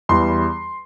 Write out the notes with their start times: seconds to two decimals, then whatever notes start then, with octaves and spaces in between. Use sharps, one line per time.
0.09 E2 E3 G3 C6